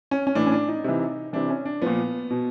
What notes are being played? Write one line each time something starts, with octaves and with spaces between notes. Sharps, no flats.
C#4
C#4
A2 E3 D4
C#4
D4
D#4
C3 E3
C3 E3 D4
C#4
D4
A#2 F3 B3
B2